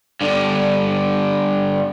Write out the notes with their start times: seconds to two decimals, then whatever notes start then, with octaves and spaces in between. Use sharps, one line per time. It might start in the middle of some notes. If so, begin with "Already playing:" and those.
0.21 G2 D3